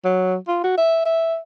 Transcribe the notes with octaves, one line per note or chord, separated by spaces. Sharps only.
F#3
F4
F#4
E5
E5